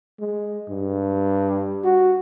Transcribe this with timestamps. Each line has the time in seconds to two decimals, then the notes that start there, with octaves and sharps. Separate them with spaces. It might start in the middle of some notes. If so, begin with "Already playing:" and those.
0.20 G#3
0.69 G2
1.84 F#4